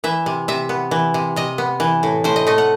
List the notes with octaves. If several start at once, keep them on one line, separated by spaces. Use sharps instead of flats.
E3 E5
C3
C3 E5
B3
E3
C3
C3 D#5
B3
E3
A2
A2 C5
D#5
A3 D#5
F#5